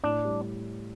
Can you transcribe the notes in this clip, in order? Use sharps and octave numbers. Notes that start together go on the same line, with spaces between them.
A2 D4
G3